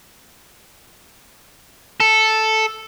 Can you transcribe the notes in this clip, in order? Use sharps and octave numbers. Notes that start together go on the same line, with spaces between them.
A4